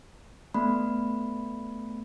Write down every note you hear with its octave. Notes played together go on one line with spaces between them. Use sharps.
A3 B3 B5